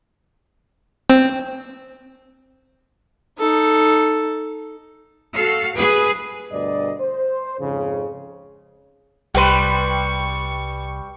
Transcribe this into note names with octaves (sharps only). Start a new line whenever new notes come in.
C4
D#4 A4
F#4 A4 F5
G#4 B4
D2 G2 B2 D5 D#5
C5
F2 G#2 C#3
C2 G3 B4 G5 C6 C#6